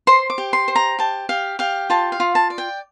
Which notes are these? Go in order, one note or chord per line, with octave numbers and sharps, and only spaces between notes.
C5 C6
D6
G4
C6
C5
A#5
G4 A5
G4 F5
G4 F5
F4 A5
F5
F4
A5
D5
G5